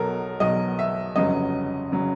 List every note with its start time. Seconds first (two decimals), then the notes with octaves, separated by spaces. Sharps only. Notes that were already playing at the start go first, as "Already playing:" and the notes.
Already playing: B1 B2 F#3 A4 A#4
0.40 B1 B2 F#3 D#5
0.79 E5
1.16 G1 F2 C#3 F#3 D#5
1.92 C#3 F#3